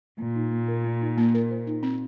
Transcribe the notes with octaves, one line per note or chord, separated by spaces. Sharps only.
A#2 A#3
D#4
A#3
A#4
A#3
D#4
A#3
A#4
C5
D#4
C4